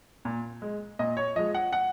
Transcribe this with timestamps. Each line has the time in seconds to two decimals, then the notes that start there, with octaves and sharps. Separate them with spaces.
0.25 A#2
0.62 G#3
0.99 A#2 D#5
1.17 C#5
1.36 F3 G#3 D#5
1.54 F#5
1.73 F#5